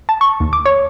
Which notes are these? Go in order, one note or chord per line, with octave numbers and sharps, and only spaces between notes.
A5
C#6
D#2
D6
C#5